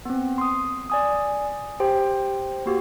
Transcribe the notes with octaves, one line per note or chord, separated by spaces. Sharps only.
B3 C4
C6 D#6
D5 G#5 D#6
G4 C5 G5
A#3 F#4 G4